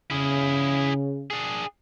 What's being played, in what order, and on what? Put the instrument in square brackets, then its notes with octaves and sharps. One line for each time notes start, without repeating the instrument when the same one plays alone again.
[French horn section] C#3 [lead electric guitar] E4 G#4
[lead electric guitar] D4 G#4